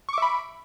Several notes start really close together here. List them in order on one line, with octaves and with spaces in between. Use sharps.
C#6 D6 E5 B5